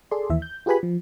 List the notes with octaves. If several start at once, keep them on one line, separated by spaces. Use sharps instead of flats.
G#4 A4 D5 C6
D#2 E3 E5
G6
F4 G4 G#4 B4 G#5 B5
F3